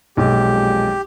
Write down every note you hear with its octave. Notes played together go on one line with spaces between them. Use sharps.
B1 F2 A#2 G#3 G4